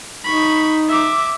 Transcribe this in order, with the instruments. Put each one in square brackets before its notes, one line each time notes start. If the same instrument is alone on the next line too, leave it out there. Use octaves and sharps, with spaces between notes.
[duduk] D#4 [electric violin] B5 C#6
[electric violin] E5 D6